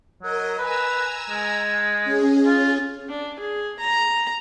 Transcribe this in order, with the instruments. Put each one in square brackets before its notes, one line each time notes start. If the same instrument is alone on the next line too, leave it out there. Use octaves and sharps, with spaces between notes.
[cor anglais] F#3 [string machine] A#4 D#5
[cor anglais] B4 [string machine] G#5 A#5 E6
[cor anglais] G#3
[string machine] C#4 G#4
[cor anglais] F4
[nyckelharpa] D4
G#4
A#5